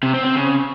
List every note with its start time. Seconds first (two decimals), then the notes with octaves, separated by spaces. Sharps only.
0.03 C3
0.14 C4
0.25 C4
0.35 C#3